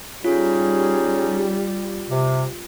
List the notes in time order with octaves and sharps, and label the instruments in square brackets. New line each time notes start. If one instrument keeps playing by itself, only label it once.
[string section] G3 [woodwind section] C#4 D#4 G#4 [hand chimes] F4
[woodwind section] C3